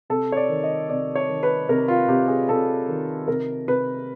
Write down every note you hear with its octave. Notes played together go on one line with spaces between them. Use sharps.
C3 A4
C#5
D5
D#3
D#5
C3 D5
C#5
D#3
B4
C3 A#4
F4
C3 G4
G#4
C3 A4
D#3
C3 A#4
C3 B4